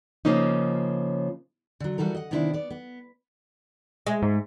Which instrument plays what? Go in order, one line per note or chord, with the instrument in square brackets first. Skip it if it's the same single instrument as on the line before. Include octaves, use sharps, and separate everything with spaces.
[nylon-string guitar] C#3 F3 A#3 C#4 D#4
[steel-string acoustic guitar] D3 F#3
E3 G3 F#4 A4 A#4
D#5 F#5
C3 D#3 B3 D4 E4 C5
B3 D5
B3
[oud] G#3
[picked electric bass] G#2